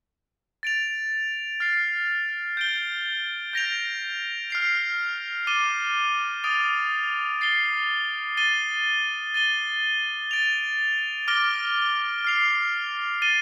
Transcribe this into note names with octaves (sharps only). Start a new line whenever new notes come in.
A6 D7 F7
F6 A6 C7
G6 D7 G7
G6 A#6 D7 F7
F6 C7 F7
D6 A6 D#7 G7
D#6 A6 D7 F7
A6 C7 G7
A6 D#7 G7
A6 D#7 G7
A6 D7 F7
D6 F6 A#6 D7 G7
F6 C7 F7
A6 D#7 G7